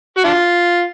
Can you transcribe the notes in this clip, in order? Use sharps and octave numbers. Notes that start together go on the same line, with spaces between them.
F#4
D4 F4